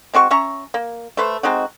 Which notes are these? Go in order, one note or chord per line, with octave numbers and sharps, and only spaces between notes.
G#3 C4 F#4 C#6
C#4 E5 A#5 C#6
A#3
A3 B4 C5
G#3 C4 D#4 F#4